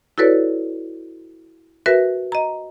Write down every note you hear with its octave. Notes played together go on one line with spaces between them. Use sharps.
E4 F#4 A4 B4 C#5 D5
F#4 A#4 B4 E5
D#5 A#5